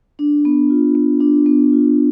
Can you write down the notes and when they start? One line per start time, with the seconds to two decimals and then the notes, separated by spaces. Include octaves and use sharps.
0.19 D4
0.45 B3
0.70 F4
0.95 B3
1.21 D4
1.46 B3
1.72 F4